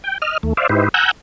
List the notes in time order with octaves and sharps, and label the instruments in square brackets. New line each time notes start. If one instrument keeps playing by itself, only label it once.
[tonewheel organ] G5
D#5 F6
D#2 A3
C5 D5 E5 F5
G#2 D#4 E4 G4 B4 C5
F#5 G#5 A#5 E6 F#6 G6